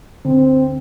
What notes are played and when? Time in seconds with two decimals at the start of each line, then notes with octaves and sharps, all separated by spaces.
0.25 D3 C4